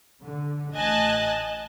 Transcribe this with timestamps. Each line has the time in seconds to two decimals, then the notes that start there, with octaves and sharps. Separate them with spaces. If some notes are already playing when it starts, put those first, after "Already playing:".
0.23 D3
0.74 A1 D#5 G#5 A5 F#6